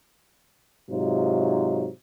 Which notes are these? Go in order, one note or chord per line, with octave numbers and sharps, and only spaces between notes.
G#2 C3 F#3 D#4 F4